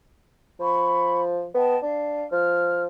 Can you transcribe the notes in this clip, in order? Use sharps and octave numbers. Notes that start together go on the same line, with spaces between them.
F3 B5 C#6
B3 D#5 G5 A5
D4 F5
F3 F6